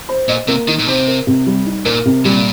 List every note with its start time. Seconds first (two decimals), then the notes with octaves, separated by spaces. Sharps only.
0.09 C5
0.28 A#2 D#5
0.48 C3 A#3
0.68 D#3 D#4
0.79 A#2
0.88 C3 C5
1.07 A#4
1.27 C3
1.46 G3
1.66 D#4
1.85 A#2 A#4
2.05 C3
2.25 A#2 G3